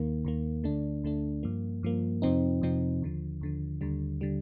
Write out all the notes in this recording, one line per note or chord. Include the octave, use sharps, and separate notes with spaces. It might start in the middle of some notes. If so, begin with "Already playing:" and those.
Already playing: D#2 D#3 A#3
D#2 D#3 A#3
D2 D3 A3 D4
D2 D3 A3 D4
G2 F3 A#3
G2 F3 A#3
F2 C3 F3 C4 D#4
F2 C3 F3 C4 D#4
D#2 D3 F3
D#2 D3 F3
D#2 D3 G3
D3 G3